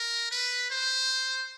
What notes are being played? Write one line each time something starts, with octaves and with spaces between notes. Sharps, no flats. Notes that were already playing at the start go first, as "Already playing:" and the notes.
Already playing: A#4
B4
C5